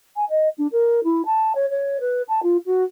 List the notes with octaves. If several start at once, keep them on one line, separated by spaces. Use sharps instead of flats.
G#5
D#5
D4
A#4
E4
A5
C#5
C#5
B4
A5
F4
F#4